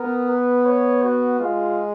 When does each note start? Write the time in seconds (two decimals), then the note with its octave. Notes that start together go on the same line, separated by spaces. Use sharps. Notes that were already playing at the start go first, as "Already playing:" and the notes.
Already playing: B3 A#4
0.29 B4
0.66 C#5
1.03 F#4
1.40 G#3 F4